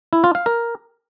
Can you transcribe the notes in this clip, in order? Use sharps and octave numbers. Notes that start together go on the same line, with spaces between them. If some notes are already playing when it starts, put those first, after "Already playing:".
E4
F4
F5
A#4